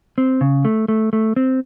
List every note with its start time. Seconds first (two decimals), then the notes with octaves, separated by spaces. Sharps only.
0.18 C4
0.41 C#3
0.65 A3
0.88 A3
1.13 A3
1.36 C4